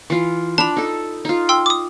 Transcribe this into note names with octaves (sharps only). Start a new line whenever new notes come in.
E3 F4
D4 A5 B5 D6 F7
D#4 A4
D#4 F4
G5 C6 E6
D6 D#6